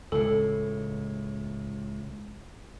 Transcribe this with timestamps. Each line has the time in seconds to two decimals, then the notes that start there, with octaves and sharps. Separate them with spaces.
0.12 C#2 A2 A4